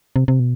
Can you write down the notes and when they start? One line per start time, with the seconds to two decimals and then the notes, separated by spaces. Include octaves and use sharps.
0.16 C3
0.28 C3
0.40 B2